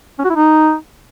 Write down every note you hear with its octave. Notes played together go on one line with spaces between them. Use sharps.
C#4
F#4
E4
D#4